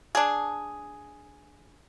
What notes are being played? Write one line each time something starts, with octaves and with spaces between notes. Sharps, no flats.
D4 G#4